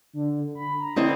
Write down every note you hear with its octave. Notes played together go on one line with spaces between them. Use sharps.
D3
B5
A#5
D3 C4 E4 D#5